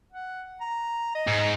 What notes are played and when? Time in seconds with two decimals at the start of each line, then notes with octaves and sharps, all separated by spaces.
0.12 F#5
0.61 A#5
1.15 D#5
1.28 G#2